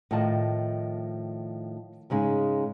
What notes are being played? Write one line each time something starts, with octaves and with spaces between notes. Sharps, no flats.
A2 D#3 F3 D5 D#5 A5
G#2 C#3 G#3 D#4